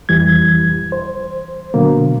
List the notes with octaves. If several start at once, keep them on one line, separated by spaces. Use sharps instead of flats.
F2 E3 G3 G#6
C5
B2 D3 F#3 A#3